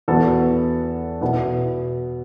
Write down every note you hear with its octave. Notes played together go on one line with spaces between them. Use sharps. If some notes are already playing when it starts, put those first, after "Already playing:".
E2 E3 B3 F#4 A4
B2 B3 E4